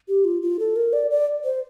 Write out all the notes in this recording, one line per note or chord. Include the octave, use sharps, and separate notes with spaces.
G4
F4
F4
A4
A#4
D5
D5
C5